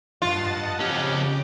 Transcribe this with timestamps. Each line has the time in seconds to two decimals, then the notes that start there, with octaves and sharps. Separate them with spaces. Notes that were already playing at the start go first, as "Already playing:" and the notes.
0.22 G2 F4 D#5 F#5 A5 A6
0.80 F2 C#3 C#4 G4 D6